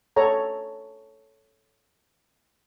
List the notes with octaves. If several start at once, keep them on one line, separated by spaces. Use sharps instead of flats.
A4 C#5 A#5